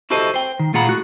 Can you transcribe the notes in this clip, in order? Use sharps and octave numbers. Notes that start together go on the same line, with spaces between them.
E4 F#4 G4 A4 C5 D#5
C5 G5
D#3
A#2 F4 G#4 F#5 A#5 B5
A2 F#4